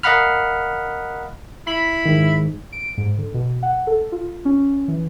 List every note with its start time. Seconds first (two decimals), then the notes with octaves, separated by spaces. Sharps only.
0.03 A#4 D#5 F5 F#5 B5 F6
1.67 E4 B5
2.06 G#2 D#3
2.72 D7
2.98 G#2
3.18 D3
3.34 B2
3.63 F#5
3.87 A4
4.12 F4
4.45 C#4
4.88 E3